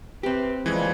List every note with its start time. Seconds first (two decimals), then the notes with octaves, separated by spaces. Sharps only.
0.23 C4 G4 B4
0.66 D#2 E3 F3 G3 G#3 G#6